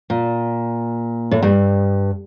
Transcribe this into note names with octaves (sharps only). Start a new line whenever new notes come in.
A#2
A2
G2